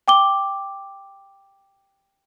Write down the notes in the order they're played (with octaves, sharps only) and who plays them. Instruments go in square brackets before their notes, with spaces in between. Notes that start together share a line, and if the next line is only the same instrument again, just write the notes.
[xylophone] G5 D6 G7